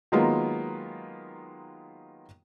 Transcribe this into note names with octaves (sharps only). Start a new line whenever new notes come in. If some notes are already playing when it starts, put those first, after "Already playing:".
D#3 F#3 G#3 A#3 B3 F4